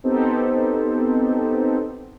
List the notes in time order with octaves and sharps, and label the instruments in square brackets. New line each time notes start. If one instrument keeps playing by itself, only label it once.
[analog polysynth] B3 C4 D#4 G4 A4 C5